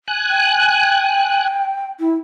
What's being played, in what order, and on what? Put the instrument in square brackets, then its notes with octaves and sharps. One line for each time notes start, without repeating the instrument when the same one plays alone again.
[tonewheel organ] G#5 F#6
[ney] G5
E4